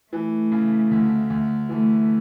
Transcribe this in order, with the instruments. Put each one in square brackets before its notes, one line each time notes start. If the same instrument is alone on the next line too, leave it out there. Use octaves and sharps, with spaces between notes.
[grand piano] E3 [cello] A3
[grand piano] C#3
D2
D2
[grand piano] E3 [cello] A3